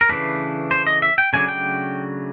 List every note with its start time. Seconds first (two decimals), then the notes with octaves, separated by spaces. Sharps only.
0.01 A#4
0.09 C#3 E3 A3 D4 B4
0.71 C5
0.87 D#5
1.02 E5
1.18 G5
1.33 C#3 F#3 A3 D4 G#5
1.48 G5